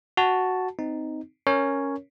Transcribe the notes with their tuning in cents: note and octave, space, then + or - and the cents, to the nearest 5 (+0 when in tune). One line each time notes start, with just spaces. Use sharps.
F#4 +0 A5 +0
C4 -25 D#4 +0
C#4 +0 A#4 +0 C#5 +0